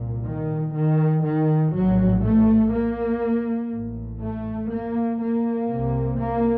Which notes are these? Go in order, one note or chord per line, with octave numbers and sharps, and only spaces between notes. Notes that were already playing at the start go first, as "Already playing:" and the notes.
Already playing: C2 A#2
D#3
D#3
D#3
A#1 A2 F#3
A3
A#3
A1 A2
A3
A#3
A#3
C2 C3
A#3